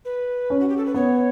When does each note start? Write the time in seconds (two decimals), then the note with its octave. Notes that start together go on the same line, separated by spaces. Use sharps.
0.05 B4
0.50 C#4
0.60 F#4
0.69 G4
0.77 A4
0.85 B4
0.94 B3 C#5